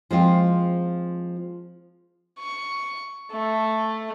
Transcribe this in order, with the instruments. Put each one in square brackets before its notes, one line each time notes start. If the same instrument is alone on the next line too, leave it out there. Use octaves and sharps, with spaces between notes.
[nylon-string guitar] F3 G#3 C4 F4
[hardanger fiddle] C#6
A3